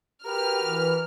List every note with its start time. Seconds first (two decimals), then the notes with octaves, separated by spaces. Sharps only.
0.25 F#4 G4 A#4 B4 F6
0.62 E3